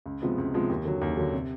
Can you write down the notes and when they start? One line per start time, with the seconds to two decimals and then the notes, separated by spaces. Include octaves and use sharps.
0.06 C#2
0.22 C3 F3 G#3 B3
0.38 C#2
0.54 C3 F3 G#3 B3
0.70 D#2
0.85 D3 F#3
1.01 D#2
1.17 D3 F#3
1.33 C3